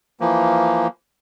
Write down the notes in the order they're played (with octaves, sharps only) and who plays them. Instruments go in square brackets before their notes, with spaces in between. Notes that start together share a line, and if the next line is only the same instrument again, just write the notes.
[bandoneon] E3 F3 A#3